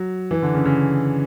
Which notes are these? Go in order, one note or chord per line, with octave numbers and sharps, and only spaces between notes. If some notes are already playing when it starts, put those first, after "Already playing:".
Already playing: F#3
E3
D3
C#3
C#3